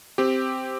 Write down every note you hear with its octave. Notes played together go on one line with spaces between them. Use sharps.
C4 G4